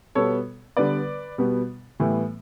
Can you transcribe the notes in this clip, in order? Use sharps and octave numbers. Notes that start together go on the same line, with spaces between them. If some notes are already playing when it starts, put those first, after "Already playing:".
B2 G3 B3 A4 C#5
D3 G3 B3 B4 D5
B2 G3 B3
A2 E3 G3 B3